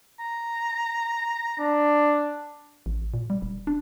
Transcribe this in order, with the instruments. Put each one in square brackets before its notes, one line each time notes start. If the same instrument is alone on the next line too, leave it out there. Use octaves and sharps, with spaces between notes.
[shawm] A#5
[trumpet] D4
[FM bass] A1
A#2
G3
D#1
D4